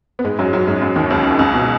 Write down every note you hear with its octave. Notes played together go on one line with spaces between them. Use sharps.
B3
G#2 G#3
F#2 F#3
F#2 F#3
G#2 G#3
F#2 F#3
D#2 D#3
C#2 C#3
C#2 C#3
B2